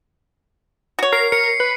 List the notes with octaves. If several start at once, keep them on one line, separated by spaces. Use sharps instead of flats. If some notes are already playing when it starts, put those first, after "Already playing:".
F#4 C#5
A#4 C7
A#4 C#7
B4